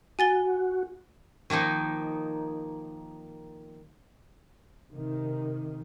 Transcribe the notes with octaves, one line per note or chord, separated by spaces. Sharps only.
F#4 G#5 A6 G7
D#3 F3 A#3 D#4
C3 D#3